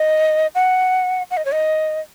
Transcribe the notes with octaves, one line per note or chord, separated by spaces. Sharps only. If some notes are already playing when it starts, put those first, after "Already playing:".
Already playing: D#5
F#5
F#5
D#5
C#5
D#5